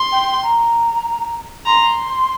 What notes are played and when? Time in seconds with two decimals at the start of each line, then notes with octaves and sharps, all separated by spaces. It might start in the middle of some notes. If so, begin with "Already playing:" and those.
Already playing: C6
0.12 G5
0.43 A#5
1.66 A#5 C6